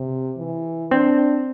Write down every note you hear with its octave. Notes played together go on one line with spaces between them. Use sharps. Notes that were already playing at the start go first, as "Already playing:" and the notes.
Already playing: C3
E3
C4 D4